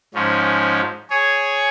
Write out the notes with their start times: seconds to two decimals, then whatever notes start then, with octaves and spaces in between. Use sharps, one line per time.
0.14 G#2 F3 C#4
1.10 G#4 C#5